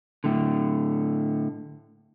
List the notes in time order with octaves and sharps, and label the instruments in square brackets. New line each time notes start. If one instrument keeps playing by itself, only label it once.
[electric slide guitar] A2 D3